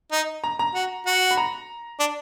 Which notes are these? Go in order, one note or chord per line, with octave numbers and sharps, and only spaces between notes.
D#4
A#5
A#5
F#4
F#4
B5
A#5
D4